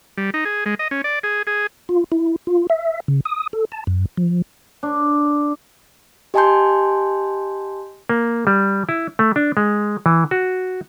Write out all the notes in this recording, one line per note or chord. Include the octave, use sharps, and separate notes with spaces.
G3
D#4
G#4
G#3
D#5
C#4
D5
G#4
G#4
F4
E4
F4
E5
C#3
D#6
A4
A5
F#2
F3
D4
G4 D#5 G#5 A5 C6 G6
A#3
G3
E4
A3
D4
G#3
E3
F#4